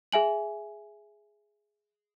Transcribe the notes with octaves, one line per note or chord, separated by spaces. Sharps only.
G#4 E5 G#5 F#7